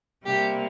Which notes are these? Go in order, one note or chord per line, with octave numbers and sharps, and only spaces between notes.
C3 G3 A#3 G4